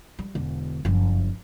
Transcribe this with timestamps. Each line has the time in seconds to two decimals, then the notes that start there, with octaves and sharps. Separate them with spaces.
0.19 G3
0.35 E1 D3
0.85 F#1 F2